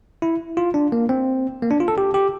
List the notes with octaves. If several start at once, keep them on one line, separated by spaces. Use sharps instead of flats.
E4
F4
D4
A#3
C4
A#3
D4
F4
A4
G4
G4